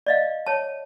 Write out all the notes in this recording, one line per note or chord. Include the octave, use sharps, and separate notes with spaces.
D5 D#5 F5
C#5 A5